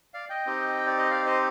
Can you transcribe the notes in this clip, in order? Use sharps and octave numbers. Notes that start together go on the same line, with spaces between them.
D5 F5
D#5 G5
C4 D#4 G4
D5
D#5
D5 F5
C5 D#5